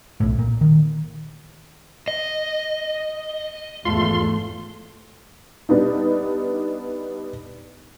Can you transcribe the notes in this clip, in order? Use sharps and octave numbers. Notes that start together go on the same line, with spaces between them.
B1 A2
A#2
D#3
D#5
G#1 E2 A3 F4 C6
G3 B3 D4 D#4